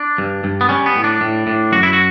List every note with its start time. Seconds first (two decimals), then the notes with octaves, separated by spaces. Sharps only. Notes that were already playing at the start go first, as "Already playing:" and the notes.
Already playing: D4
0.18 G2
0.44 G2
0.61 B3
0.69 G3 C#4
0.86 B3
0.96 A2
1.04 D4
1.21 A2
1.47 A2
1.72 F#2 F#4
1.83 E4
1.93 F#4